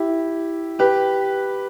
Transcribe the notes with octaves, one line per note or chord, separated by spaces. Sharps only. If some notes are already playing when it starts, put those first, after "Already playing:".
Already playing: E4 G4
G4 B4